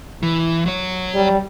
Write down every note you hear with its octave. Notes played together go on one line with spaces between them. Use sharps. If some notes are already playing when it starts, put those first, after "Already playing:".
E3
F#3 C#5
G3